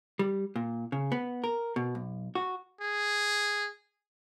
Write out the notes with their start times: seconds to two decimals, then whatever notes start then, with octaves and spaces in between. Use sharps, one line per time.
0.19 G3
0.56 A#2
0.92 C#3
1.12 B3
1.44 A#4
1.76 B2
1.95 B1
2.35 F#4
2.81 G#4